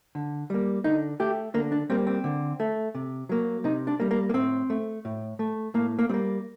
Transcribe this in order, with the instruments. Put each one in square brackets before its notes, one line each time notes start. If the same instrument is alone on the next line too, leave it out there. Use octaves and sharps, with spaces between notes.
[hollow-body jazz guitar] D3
G3 A#3
D3 D#4
A3 G4
D3 A#3
D4
G3 A#3 C4
C4
D3
A3
C3
F#3 A#3
C3 D#4
D4
G3 A#3
A#3
A#3
A2 C4
A3
A2
A3
A2 A#3
A#3
G3 C4
A#3